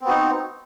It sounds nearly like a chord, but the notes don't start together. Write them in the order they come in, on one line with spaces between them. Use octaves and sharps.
C4 B3 F#4 D#4